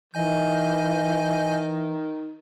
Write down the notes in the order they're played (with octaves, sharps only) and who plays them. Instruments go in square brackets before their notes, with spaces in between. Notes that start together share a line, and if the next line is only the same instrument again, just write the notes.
[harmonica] D#3 [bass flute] E3 [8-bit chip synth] D#5 G#5 G6